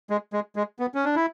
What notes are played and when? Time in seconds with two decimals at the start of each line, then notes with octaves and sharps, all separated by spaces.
0.10 G#3
0.33 G#3
0.56 G#3
0.79 B3
0.95 C#4
1.05 D4
1.16 E4